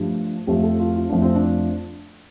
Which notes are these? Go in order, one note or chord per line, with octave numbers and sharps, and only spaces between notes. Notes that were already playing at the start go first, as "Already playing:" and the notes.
Already playing: G2 F3 A3 D4
F2 F3 A3 G4
A4
F4
F4
F2 F3 A3 D4
C4
D4